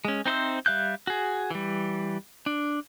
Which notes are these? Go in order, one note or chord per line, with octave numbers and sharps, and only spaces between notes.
G#3 C#4
C4 D#4 C5 E5 E6
G3 E5 F5 F#6 G6
F#4 G#4
E3 G3
D4